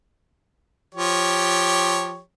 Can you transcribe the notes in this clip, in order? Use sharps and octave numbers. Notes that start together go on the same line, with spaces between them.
F3 G4 C#5